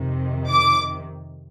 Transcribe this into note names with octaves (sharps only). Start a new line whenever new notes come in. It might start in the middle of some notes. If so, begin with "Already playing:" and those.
Already playing: F2 C3 D#3
D6